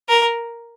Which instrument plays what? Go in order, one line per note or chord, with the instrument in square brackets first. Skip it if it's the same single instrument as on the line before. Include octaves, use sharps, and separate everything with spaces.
[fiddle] A#4